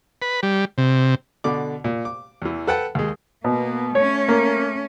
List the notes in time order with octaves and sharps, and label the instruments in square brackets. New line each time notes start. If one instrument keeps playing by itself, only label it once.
[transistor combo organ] B4
G3
C3
[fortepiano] B2 D3 D5 D6
A#2
D6
E2 E3
A4 B4 F#5 G5 A5
D#2 G#3
[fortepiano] B2 [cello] A#3 B3
[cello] A3 C#4 [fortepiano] C#5
[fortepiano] A#3